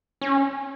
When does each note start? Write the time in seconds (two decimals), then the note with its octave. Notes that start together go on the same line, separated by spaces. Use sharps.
0.21 C#4